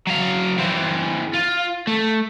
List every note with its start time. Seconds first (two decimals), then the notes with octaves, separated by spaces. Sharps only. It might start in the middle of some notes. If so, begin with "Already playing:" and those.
0.07 F#3 F5
0.58 E3 C4
1.34 F4
1.87 A3